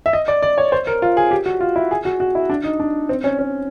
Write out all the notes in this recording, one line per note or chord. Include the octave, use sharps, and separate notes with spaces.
E5
D#5
D5
D5
C#5
C5
A#4
F4
G#4
G4
F#4
F4
E4
G#4
F#4
F#4
E4
D4
D#4
D4
C4
C#4
C#4